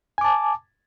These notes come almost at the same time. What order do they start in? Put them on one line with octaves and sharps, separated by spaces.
G#5 D6 A5